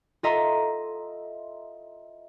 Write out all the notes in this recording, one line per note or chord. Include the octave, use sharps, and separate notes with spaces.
F4 A4 D#5 E5 A#5 C6